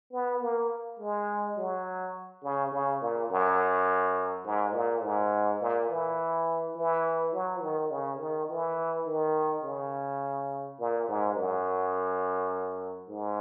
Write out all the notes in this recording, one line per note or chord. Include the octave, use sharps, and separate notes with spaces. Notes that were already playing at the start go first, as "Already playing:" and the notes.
B3
A#3
G#3
F#3
C#3
C#3
A#2
F#2
G#2
A#2
G#2
A#2
E3
E3
F#3
D#3
C#3
D#3
E3
D#3
C#3
A#2
G#2
F#2
G#2